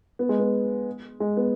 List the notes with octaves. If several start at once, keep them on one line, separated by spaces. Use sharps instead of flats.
B3
G#3
B3
G#3
B3